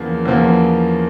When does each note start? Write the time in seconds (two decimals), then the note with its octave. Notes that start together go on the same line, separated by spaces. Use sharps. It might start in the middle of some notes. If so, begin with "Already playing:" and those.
Already playing: E2 C#3 F3 A#3
0.25 E2 C#3 F3 A#3